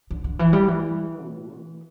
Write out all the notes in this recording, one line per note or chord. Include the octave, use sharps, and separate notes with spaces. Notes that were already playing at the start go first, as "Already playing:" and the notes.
D3
D3
E3
G3
E3
A2
E3